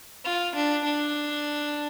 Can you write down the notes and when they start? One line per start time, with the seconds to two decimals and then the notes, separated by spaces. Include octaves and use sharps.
0.24 F4
0.54 D4
0.84 D4